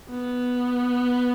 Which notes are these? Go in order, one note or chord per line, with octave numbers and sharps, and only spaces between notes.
B3